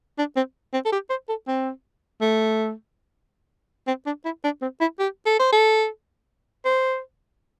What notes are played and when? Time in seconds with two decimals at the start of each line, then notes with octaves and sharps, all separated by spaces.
0.18 D4
0.36 C4
0.73 C4
0.86 A4
0.92 G4
1.10 C5
1.29 A4
1.47 C4
2.21 A3
3.87 C4
4.06 D4
4.25 E4
4.44 D4
4.62 C4
4.81 E4
4.99 G4
5.26 A4
5.39 C5
5.53 A4
6.65 C5